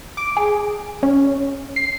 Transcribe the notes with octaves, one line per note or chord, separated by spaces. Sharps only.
D6
G#4
C#4
C7